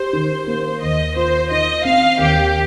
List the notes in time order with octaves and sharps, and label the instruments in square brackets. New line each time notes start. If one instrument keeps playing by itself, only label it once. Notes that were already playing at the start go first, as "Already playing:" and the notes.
Already playing: [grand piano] G4 [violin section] C5
[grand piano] D#3
[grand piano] A#3 [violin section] C5
[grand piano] D#2 [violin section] D#5
[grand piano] F4 [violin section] C5
[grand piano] D#3 [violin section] D#5
[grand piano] C4 [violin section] F5
[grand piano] D#2 [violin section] G4